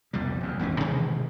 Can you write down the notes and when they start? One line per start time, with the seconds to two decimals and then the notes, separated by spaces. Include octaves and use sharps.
0.13 C2 F2 B2 G3
0.41 F#1 E2
0.59 G#1 E2 C#3 C#4
0.80 B2 D#3 E3 G#3